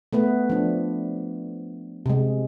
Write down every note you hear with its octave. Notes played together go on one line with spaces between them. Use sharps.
A3 B3 B4
F3 D4
C3 G#3